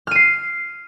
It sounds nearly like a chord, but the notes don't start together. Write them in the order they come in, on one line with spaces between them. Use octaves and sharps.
F6 D#7 C7